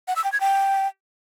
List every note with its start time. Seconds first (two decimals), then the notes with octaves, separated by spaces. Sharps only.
0.08 F#5
0.16 E6
0.24 G5
0.32 G#6
0.41 G5